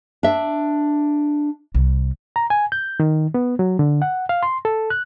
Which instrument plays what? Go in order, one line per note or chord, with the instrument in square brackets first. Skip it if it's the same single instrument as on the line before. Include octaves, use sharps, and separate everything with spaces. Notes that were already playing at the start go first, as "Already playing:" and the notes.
[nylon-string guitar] D4 E5
[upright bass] C2
[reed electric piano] A#5
G#5
G6
D#3
B3
F#3
D3
F#5
F5
C6
A4
F#6